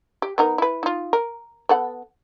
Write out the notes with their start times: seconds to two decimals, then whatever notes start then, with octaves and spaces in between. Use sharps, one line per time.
0.22 G4
0.38 B3 D#4 A#4
0.58 E4 B4
0.83 D#4 F4
1.13 A#4
1.69 B3 A4 F#5